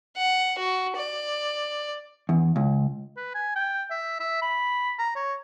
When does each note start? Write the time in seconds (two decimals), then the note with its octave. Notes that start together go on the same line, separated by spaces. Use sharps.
0.16 F#5
0.59 F#4
0.96 D5
2.29 E2
2.56 C#2
3.17 B4
3.35 G#5
3.56 G5
3.91 E5
4.20 E5
4.42 B5
4.99 A#5
5.16 C#5